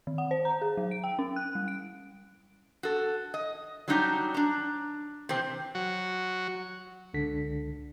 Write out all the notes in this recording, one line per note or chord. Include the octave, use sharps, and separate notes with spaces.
D#3
F#5
C5
A#5
G#4
F#3
D7
G5
C#4
F#6
G3
D7
F#4 A4
D#5
F#3 G3 D4 D#4 F4 G4
D4 A#5
C3 E3 C4
F#3 F#4
C#2 D3 B6